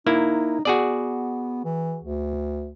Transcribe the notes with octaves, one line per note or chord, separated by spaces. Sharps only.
A#3 D#4 E4
B3 F#4 G#4 D5
E3
D2